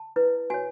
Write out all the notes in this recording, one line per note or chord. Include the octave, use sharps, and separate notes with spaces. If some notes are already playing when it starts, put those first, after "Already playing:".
Already playing: A5
E4 B4
F#4 C#5 G#5